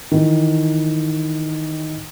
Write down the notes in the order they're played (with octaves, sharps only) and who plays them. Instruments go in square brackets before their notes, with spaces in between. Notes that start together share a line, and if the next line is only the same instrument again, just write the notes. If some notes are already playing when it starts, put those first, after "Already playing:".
[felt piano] D#3 E3